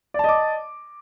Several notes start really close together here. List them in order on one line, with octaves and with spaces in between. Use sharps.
D5 A5 D#5 D6